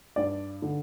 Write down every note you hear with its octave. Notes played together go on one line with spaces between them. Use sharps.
G2 D5
D3